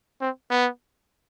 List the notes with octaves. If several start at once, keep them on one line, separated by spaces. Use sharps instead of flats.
C4
B3